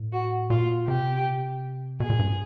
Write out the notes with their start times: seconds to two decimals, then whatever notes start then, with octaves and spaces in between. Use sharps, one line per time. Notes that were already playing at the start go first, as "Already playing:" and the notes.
Already playing: A2
0.13 F#4
0.50 A#2 F4
0.87 C3 G4
2.00 B2 G#4
2.10 A#2
2.19 G2